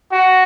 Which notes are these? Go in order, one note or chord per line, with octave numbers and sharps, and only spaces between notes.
F#4